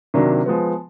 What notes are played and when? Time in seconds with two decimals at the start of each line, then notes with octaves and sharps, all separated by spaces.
0.14 C3 D#3 F#3 A#3 D4
0.46 F3 G#3 B3